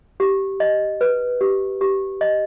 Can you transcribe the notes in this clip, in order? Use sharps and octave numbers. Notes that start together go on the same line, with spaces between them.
G4
D#5
B4
G4
G4
D#5